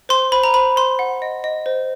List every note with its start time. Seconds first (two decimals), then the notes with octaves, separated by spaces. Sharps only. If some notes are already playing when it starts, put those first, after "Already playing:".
0.09 C5 C6
0.32 C5 B5
0.44 A#5
0.54 C5 B5
0.76 C5 C6
0.99 F#5
1.22 D#5
1.44 D#5
1.66 C5